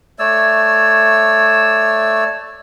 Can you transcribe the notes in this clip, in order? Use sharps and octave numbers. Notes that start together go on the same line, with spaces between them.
A3 C#5 D5 E6